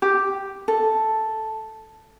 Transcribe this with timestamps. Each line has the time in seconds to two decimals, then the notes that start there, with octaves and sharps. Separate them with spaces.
0.02 G4
0.68 A4